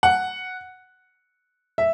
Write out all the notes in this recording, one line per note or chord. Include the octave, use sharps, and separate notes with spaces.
F#5
E5